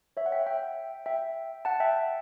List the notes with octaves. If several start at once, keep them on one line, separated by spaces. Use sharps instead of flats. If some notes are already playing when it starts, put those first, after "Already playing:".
C#5 E5
F#5
E5 G5
E5 G5
E5 G5
F#5 A5
E5 G5